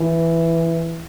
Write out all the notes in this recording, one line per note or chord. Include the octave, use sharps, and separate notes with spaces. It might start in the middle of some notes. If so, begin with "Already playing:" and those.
Already playing: E3